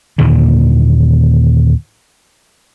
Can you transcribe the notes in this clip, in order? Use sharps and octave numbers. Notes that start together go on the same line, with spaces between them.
D#2 A#2 D3 D#3